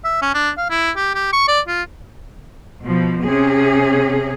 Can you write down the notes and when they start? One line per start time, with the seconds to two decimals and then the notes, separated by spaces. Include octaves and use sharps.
0.05 E5
0.22 C#4
0.34 D4
0.58 F5
0.70 E4
0.96 G4
1.15 G4
1.33 C#6
1.48 D5
1.68 F4
2.82 B2 F3
3.23 C3 C#4 G#4